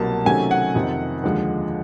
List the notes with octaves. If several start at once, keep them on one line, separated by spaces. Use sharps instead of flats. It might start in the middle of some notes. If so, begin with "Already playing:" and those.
Already playing: C2 B2 F#3 A#3 A5
C3 D#3 F#3 A3 C#4 G#5
F#5
F2 C3 D#3
D#2 D3 F3 G#3